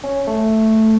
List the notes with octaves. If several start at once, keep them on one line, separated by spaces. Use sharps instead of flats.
C#4
A3